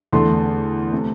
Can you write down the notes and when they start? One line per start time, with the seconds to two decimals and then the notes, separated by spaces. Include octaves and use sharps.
0.13 E2 D3 A3 C6
0.92 C3 A3